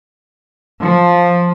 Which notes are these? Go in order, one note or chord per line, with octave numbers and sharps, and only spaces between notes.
F3